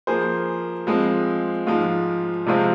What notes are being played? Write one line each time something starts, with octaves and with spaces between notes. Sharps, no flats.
F3 A#3 G#4 C5
F3 G#3 C4
G#2 F3 G#3 F4
C3 F3 G#3 C4 F4